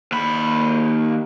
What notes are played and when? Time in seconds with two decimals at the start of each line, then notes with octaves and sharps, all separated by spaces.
0.12 D#2 B5